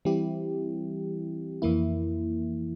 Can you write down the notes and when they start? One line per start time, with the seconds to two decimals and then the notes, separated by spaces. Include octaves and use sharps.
0.05 E3 G3 C4 E4 G4
1.62 F2 E3 A#3 E4